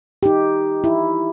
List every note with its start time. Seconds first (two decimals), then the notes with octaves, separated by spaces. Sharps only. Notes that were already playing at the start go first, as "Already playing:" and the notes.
0.23 D#4 G4
0.84 E4